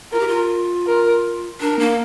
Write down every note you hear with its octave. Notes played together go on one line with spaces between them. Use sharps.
F4 A#4
G4
F4
A#4
D4 A#4
A#3